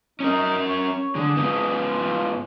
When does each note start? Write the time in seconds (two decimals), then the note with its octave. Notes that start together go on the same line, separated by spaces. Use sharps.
0.20 C#4 D#4 A#4
0.67 C#5
1.15 D3 G#4
1.36 G#2 B3
1.85 F4